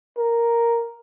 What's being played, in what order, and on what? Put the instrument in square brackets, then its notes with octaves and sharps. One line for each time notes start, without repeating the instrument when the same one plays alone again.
[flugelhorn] A#4